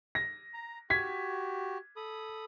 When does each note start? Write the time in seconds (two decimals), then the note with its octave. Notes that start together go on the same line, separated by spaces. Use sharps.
0.15 A#6
0.54 A#5
0.90 F#4 G4 G#6 B6
1.96 A4 B5 D#6